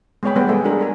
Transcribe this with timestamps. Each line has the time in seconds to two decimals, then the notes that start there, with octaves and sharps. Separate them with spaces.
0.23 G#3 B3 G#4 C#5 G5 B5
0.36 G3 A3 B3 B4 F#5 G5
0.49 G#3 G#4 A4 E5 G#5
0.64 D4 F#4 G#4 A#4
0.79 A4 A#4 G#5